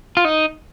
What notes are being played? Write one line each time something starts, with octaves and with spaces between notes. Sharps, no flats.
F4
D#4